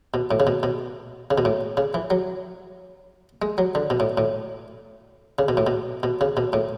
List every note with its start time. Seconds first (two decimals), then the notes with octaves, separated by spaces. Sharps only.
0.14 B2
0.31 A2
0.40 C#3
0.47 B2
0.63 B2
1.31 C#3
1.38 B2
1.45 A2
1.77 C#3
1.94 E3
2.10 F#3
3.42 G#3
3.58 F#3
3.75 D3
3.90 B2
4.00 A2
4.18 A2
5.39 C#3
5.48 B2
5.57 A2
5.67 B2
6.03 B2
6.21 C#3
6.37 B2
6.53 A2